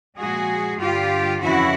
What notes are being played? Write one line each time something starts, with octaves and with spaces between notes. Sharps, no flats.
A#2 F3 G#3 F#4 G#4
G2 D3 G3 F4 G4
F2 C#3 E3 E4 F#4